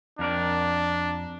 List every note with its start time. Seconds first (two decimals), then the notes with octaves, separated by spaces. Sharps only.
0.19 F2 D4 A#4 D5